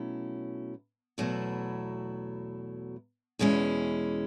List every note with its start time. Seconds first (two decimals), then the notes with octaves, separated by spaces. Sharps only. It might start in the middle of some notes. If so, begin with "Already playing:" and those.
Already playing: B2 F#3 A3 C#4 E4
1.18 E2 B2 F#3 A3 E4
3.39 E2 B2 G#3 C#4 E4